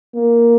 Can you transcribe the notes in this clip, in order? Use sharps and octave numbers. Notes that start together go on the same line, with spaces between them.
A#3